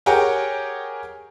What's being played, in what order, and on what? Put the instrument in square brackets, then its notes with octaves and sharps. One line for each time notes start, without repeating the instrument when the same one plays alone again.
[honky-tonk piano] G4 G#4 A#4 C#5 F#5 G5